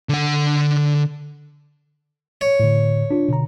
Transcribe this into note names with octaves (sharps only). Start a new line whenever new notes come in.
D3 F#5
C#5
A2 D3
D4 F4
B2 D3 A#5